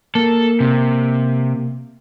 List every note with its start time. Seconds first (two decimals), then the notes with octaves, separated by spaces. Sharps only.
0.15 A#3 A4
0.60 C3